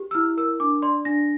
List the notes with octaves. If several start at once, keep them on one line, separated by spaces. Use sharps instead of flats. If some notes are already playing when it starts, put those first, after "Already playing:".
Already playing: G4
E6
E4 F6
A#4 E6
D4 D6
D5 C6
D4 A#6